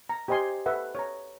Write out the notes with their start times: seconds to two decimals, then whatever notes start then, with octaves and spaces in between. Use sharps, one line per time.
0.09 A#5
0.28 G4 C5 D#5 G#5 C6
0.66 A4 B4 E5 F#5
0.95 C#5 A#5